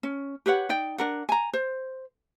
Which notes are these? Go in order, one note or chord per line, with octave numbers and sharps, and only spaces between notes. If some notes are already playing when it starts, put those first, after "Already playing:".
C#4
G4 B4 C#5 F#5
D#4 D5 G5
D4 A#4 F#5
G#5 A#5
C5